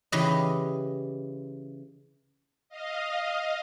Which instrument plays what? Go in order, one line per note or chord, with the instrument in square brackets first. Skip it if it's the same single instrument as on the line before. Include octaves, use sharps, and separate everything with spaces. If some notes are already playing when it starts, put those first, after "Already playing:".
[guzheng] C#3 E3 G4 B4 D#5
[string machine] D#5 F5